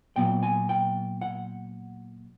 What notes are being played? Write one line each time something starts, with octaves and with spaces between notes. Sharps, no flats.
A#2 F#3 B3 G5
G#5
G5
F#5